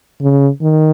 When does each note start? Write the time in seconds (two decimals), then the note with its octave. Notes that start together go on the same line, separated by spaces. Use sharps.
0.21 C#3
0.61 D#3